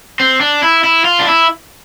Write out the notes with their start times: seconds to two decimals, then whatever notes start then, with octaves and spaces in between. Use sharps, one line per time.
0.20 C4
0.41 D4
0.63 E4
0.84 E4
1.05 F4
1.19 D4
1.27 E4